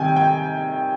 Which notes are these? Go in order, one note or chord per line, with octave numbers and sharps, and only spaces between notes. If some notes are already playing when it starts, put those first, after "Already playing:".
Already playing: C3 D#3 G3 G5 G#5
G5